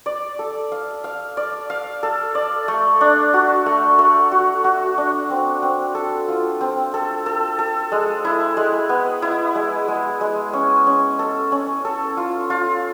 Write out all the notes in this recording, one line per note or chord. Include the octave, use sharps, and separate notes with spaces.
D5
A4
F5
F5
D5
F5
A4
D5
A3
D4
F#4
A3
A3
F#4
F#4
D4
C4
C4
A4
F4
C4
A4
A4
A4
G#3
E4
G#3
B3
E4
G#3
G#3
G#3
C#4
C#4
A4
C#4
A4
F4
F4